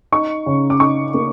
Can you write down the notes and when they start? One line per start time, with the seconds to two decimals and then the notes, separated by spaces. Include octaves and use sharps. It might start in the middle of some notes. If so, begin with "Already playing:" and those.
0.12 D#4 C#6
0.46 C#3
0.70 D6
0.80 D#4 C#6
1.14 A#3